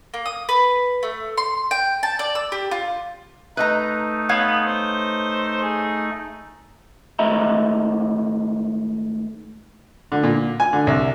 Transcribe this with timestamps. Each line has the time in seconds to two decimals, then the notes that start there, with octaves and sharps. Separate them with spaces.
0.14 A#3
0.26 D#6
0.49 B4
1.03 A3
1.37 C6
1.71 G5
2.03 A5
2.19 D5
2.35 E6
2.52 G4
2.71 F4
3.57 A3 D#4 B4 D#5 A#5
4.29 B3 B4 C#5 F5
4.66 C5
5.62 G#4
7.19 G#2 D#3 A3 D#5 E5 A#5
10.12 D3
10.23 A#2
10.60 G#5
10.73 D3
10.87 C2